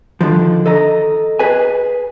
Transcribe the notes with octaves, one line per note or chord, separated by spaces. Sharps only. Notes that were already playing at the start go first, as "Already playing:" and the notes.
D3 D#3 F3
A4 D#5 A#5
G#4 B4 G#5